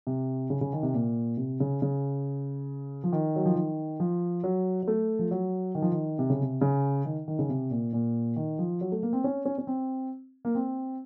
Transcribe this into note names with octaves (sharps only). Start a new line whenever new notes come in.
C3
C#3
C#3
D#3
C3
A#2
C3
C#3
C#3
F3
D#3
F#3
F3
D#3
F3
F#3
F#3
A3
F3
F#3
D#3
F3
D#3
C3
C#3
C3
C#3
D#3
D#3
C#3
C3
A#2
A#2
D#3
F3
F#3
A3
A#3
C4
C#4
C#4
C#4
C4
A#3
C4